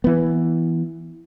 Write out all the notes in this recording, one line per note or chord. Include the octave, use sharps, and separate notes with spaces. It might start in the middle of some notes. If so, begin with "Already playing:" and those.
E3 B3